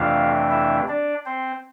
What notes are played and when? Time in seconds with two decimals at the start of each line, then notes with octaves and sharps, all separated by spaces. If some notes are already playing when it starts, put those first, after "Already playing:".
Already playing: F2 C3 E3 A3 D4 F4 F5
0.51 E4 E5
0.88 D4 D5
1.26 C4 C5